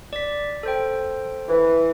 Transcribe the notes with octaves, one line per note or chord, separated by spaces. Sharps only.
D5 B6
A4 C5 G5
E3